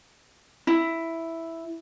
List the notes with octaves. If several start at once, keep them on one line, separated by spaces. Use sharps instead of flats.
E4